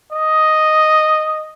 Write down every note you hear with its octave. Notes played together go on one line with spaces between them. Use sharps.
D#5